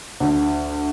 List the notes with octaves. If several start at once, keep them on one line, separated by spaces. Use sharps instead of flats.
D2